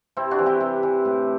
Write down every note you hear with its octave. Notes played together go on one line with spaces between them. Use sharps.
C3 C4 E4
D4 F#4
E3
E4 G4
C3
E3
A2